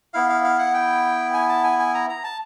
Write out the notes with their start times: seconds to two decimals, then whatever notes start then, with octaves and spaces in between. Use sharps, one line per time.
0.14 B3 E4 F5
0.29 F5
0.44 F5
0.59 F#5
0.74 G5
1.34 G#5
1.49 A5
1.64 G#5
1.79 G#5
1.95 A#5
2.09 A#5
2.24 A5